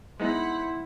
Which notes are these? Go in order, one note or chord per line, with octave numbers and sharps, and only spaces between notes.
G#3 B3 D#4 E4 C5 F#5 B5